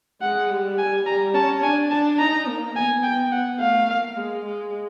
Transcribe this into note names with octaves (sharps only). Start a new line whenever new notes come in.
G#3 F#5
G3
G#5
G3 A#5
C#4 A5
D4 G#5
D4 A5
D#4 A#5
A#3
B3 G#5
G5
F#5
A3 F5
A#3
G#3
G#3